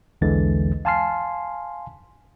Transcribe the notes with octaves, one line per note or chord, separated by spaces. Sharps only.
B1 E2 D3 E3 G#3 A6
F5 G#5 A5 C6 F6 C7